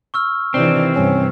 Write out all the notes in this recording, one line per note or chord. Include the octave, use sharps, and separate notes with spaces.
C#6 E6 F6
C3 D#3 E3 C4 D4
G2 C3 C#4